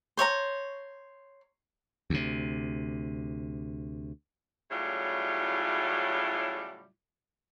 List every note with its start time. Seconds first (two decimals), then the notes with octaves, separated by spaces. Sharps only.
0.17 C5 C#5 D#5 A#5
2.10 D2 C3
4.71 A2 C#3 F#3 G3 E4 F4